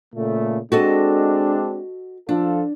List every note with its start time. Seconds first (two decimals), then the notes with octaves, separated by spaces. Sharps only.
0.15 A#2 C#3 A3
0.72 G#3 C4 D4 F#4 A4 D#5
2.29 F3 D4 F4 A4